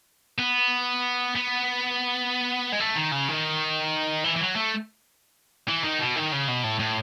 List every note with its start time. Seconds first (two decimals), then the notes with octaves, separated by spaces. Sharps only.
0.39 B3
1.36 B3
2.73 G#3
2.80 A3
2.96 D#3
3.12 C#3
3.28 D#3
4.24 E3
4.36 E3
4.40 F#3
4.56 A3
5.68 E3
5.84 D#3
6.00 B2
6.16 D#3
6.32 C#3
6.48 B2
6.64 A2
6.80 A2